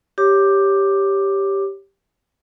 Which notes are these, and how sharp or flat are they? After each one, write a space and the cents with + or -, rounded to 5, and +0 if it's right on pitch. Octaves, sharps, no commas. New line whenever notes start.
G4 +0 C#5 +0 D6 +10